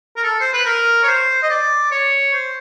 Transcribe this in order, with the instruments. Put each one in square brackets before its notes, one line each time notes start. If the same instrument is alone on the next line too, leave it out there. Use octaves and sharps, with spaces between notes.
[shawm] A#4
A4
C5
B4
A#4
C#5
C5
D#5
D5
C#5
C5